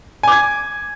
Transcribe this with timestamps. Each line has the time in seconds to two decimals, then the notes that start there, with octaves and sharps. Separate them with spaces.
0.23 G#5
0.28 D6
0.32 G#6